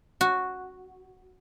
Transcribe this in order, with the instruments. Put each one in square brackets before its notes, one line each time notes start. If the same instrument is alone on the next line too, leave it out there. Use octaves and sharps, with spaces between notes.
[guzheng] F#4